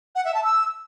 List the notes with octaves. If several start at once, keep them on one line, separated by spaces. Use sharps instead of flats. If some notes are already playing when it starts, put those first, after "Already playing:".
F#5
E5
A5
E6